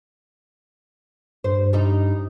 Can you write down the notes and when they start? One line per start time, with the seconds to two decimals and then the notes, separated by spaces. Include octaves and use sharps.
1.44 G2 C5
1.73 G3 D#4